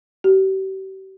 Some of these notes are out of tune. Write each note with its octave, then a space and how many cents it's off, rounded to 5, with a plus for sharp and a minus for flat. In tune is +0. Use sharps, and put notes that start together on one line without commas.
G4 -40